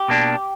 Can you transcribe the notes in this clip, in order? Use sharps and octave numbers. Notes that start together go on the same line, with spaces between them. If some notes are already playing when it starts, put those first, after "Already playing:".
Already playing: G4
B2 A#3 D4